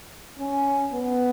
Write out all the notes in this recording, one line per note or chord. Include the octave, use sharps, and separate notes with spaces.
C#4
B3